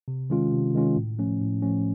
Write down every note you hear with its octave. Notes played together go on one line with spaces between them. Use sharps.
C3
D#3 G#3 C#4 F4
C3
D#3 G#3 C#4 F4
A2
F3 A3 C#4
A2
F3 A3 C#4